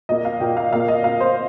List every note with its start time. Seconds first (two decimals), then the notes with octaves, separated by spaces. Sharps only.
0.09 A#2 A#3 D#5
0.25 F5
0.40 A#2 A#3 G5
0.57 F5
0.73 A#2 A#3 F5
0.88 D#5
1.04 A#2 A#3 F5
1.20 C5